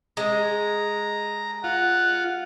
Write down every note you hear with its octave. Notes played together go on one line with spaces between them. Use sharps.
G#3 A#5
F4 F#5